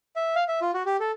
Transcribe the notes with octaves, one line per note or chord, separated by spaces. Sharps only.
E5
F5
E5
F4
F#4
G4
A4